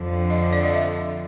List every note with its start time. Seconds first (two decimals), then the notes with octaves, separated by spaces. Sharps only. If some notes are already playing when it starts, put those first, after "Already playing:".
Already playing: F2 D3 F3
0.30 D#5
0.53 D5
0.63 D#5
0.74 E5